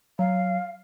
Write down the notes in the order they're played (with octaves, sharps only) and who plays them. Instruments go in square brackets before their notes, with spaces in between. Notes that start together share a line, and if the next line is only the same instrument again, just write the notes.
[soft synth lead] F#3 [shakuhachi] F5